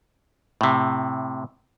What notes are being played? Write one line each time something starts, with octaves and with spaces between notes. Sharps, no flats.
A2 C3